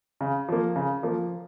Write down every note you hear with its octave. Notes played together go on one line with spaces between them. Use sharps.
C#3
F3 A#3
C#3
F3 A#3